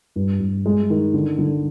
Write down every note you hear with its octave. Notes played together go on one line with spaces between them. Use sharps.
G2
G2
G#3
D#3
D3
D3